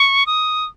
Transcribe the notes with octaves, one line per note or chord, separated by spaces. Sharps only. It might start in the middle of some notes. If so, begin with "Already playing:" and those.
Already playing: C#6
D#6